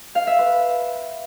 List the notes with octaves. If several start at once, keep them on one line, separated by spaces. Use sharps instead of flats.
F5
E5
B4